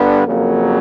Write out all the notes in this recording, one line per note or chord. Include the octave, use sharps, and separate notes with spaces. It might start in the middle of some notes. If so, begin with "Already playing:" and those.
Already playing: G2 D3 B3
F2 C#3 F#3 A#3